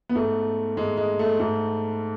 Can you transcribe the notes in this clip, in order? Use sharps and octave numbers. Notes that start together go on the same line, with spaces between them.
B3
G#2 A3
G#2 G#3
G#3
A3
G#2 A3